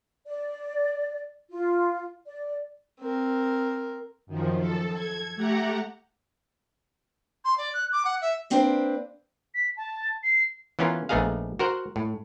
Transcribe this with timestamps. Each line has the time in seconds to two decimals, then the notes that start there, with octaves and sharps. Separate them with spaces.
0.27 D5
1.51 F4
2.27 D5
3.00 C4 A#4
4.27 F#2 D#3 F3
4.59 A4
4.94 G#6
5.35 A3 G4 F#5 A#5
7.45 C6
7.58 D5
7.74 F#6
7.92 D6
8.05 F#5
8.21 E5
8.50 A#3 C4 D4 B4 C5 D5
9.54 B6
9.77 A5
10.23 C7
10.79 E3 B3 C#4 F4 A#4
11.09 A#1 A3 B3 D#4 G#4 F5
11.59 F#4 A#4 C5 F#5
11.96 A2